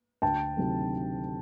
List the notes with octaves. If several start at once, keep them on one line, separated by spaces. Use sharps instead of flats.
D2 G5 A5
C3 D#3 F#3 A3